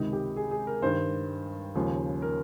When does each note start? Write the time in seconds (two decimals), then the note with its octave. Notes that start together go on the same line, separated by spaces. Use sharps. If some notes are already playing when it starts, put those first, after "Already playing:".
Already playing: C#2 C3 D#3 D#4
0.13 G4
0.36 G#4
0.51 G#4
0.67 A#4
0.82 G2 D#3 C5
1.75 D#2 C#3 F3
2.22 A#4